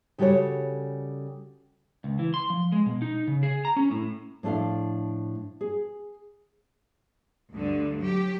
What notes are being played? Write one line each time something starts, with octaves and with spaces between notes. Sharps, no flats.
C#3 G3 F#4 A4 C#5
C#2
E3
C6
F3
G#3
B2
D#4
C#3
G#4
A#5
C#4
A2
A2 F3 D4 A4 E5 F5
G#4
D2 G2 D3
F#3 G4